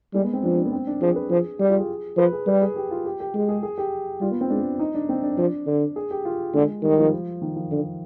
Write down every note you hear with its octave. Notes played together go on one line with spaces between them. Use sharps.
G3 G#3
B3
C4
F3 D4
D4
B3
C4
D4
F3 G#4
B4
F3 G#4
G3 G4
F4
G#4
F3 B4
G#4
G3 B4
G#4
G4
F4
G4
G4
G#3 G4
G#4
G#4
G4
G3 F4
B3
C4
G#3 D4
D#4
D4
C4
D4
F3
D3
G#4
G4
F4
D3 G#3
D#3 G3
F3
D#3
F3
D3